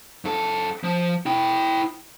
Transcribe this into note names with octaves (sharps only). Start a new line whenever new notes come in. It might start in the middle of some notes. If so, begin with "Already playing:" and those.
F#2 A4
F3
E4 G5